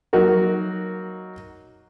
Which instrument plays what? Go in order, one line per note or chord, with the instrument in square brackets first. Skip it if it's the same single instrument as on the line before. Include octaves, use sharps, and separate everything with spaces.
[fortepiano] F#3 A#3 D#4 F#4 A#4